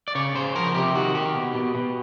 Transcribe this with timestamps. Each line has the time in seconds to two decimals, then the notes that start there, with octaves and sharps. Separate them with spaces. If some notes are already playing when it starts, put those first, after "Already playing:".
0.08 D5
0.15 C#3 C#5
0.35 C#3 C5
0.55 F3 A#4
0.75 C3 G4
0.95 D#3 F#4
1.15 D#3 G4
1.35 B2
1.55 B2
1.75 B2